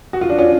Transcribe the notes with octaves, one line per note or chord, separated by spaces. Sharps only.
F#4
F4
D4
C#4 F4